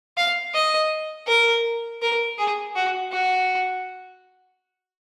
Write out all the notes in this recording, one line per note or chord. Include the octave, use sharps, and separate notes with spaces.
F5
D#5
A#4
A#4
G#4
F#4
F#4